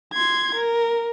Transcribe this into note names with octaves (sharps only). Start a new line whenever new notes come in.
C6 G#6
A#4